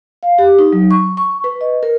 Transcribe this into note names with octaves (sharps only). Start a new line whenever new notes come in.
F5
G4
D#4
F#3
C#6
C#6
B4
D#5
A#4